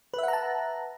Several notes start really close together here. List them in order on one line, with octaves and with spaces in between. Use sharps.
B4 E5 F#5 A#5 A5